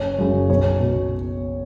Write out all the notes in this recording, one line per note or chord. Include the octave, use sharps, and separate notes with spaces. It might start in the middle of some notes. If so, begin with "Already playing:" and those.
Already playing: F#1 C#5
F#2 C#3
B1 C#5
B2